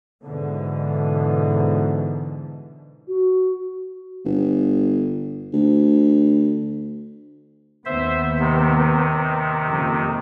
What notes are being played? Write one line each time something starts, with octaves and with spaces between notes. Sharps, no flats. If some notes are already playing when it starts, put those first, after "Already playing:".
G#2 B2 D3 E3
F#4
G1
D2
D#2 B3 C5 E5
C3 D#3
F#1 F2